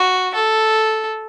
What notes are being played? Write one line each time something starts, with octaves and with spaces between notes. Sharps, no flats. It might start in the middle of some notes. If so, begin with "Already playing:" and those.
Already playing: F#4
A4